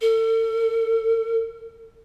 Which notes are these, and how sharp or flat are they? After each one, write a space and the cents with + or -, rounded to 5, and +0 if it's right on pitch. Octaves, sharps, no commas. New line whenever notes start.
A4 +40